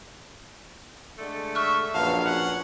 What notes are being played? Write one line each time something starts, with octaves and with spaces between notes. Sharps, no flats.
D3 G#3 A3
E5 C#6 F6 F#6
A#1 F#2 B4 F5 A5
C#4 F#5